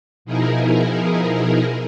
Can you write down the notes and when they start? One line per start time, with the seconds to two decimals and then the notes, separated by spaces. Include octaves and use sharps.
0.25 B2 F3 D#4 E4 G#4 A#4